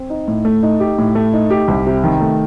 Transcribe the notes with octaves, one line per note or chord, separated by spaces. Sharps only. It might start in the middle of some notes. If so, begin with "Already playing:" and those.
Already playing: C4
D#4
A2
A3
D#4
G4
A2
A3
D#4
G4
C2
C3
D#3
A3